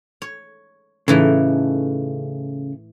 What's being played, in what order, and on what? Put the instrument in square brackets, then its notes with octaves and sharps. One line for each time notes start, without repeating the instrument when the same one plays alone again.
[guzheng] C#5
[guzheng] A2 E3 D#4 [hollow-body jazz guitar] C#3 A3